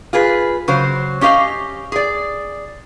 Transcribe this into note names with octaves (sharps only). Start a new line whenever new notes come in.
F4 G#4 B4
C#3 F#3 C5
C#4 G4 D#5 F5
G#4 D5